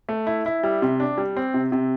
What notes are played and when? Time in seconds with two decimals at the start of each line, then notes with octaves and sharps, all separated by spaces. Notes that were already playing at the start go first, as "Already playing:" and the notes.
0.09 A3
0.27 E4
0.46 E4
0.63 G3
0.82 C3
1.00 D4
1.18 G3
1.36 C4
1.54 C3
1.72 C3